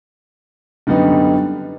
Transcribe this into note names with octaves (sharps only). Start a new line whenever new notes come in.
F#2 D3 G3 B3 D#4